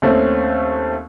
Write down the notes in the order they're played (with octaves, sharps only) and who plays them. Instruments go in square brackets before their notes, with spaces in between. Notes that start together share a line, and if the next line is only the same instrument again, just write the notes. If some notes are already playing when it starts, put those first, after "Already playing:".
[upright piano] D#2 A3 C4 C#4 C5